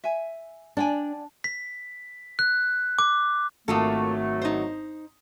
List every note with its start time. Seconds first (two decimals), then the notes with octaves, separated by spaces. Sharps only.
0.04 E5 G#5
0.77 D4 D5 G5 G#5
1.44 B6
2.39 F#6
2.99 D6
3.68 G#1 F#3 A3 A#3 F4 A4 D#6
4.42 D#4 C5